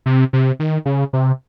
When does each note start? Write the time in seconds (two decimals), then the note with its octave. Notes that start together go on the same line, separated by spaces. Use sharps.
0.06 C3
0.33 C3
0.60 D#3
0.86 C#3
1.13 C3